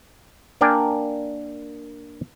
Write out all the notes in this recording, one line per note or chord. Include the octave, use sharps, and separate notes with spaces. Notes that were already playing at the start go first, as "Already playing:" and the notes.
A#3 D4 A#4 D5 G5 G#5